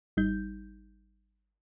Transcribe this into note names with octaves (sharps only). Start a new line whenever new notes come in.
G#1 G3 D#4 G6